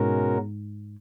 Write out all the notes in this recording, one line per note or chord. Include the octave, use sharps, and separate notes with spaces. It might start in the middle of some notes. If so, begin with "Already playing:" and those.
Already playing: G#2 B2 G#3 C#4 F#4 A#4